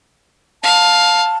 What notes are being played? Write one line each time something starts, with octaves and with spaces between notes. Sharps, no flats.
F5 A5